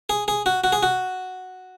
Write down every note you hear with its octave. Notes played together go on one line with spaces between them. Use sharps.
G#4
G#4
F#4
F#4
G#4
F#4